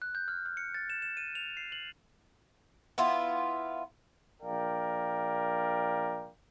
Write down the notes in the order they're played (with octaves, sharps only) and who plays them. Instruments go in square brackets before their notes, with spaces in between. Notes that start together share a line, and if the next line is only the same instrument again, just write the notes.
[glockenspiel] F#6
G6
F6
F6
C#7
A6
E7
E7
D#7
F7
C7
F#7
[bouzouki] B3 E4 F4
[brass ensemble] A#1 A#4 D5 F5 G5